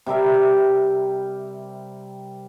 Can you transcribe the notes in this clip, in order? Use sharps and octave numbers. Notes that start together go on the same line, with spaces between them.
C3 G3 A#4 E5